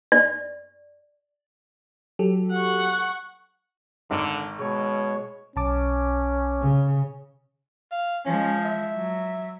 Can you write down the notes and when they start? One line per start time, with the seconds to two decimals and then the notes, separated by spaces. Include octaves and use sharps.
0.12 D5
2.19 F#3 G4 A4
2.52 F#5 C#6
4.11 G#1 D3
4.60 B2 G#3 C#5
5.56 B1 C#4 A5 D6
6.62 C#3
7.92 F5
8.26 F3 G#3 C#4
8.64 E5
8.95 F#3